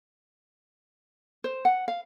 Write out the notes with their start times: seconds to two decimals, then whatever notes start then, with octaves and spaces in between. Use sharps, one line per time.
1.44 C5
1.65 F#5
1.88 F5